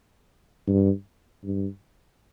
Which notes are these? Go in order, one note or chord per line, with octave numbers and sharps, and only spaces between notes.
G2
G2